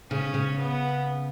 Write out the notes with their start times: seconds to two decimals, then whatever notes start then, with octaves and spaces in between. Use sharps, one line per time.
0.10 C#3 C#4
0.34 C#3
0.58 B3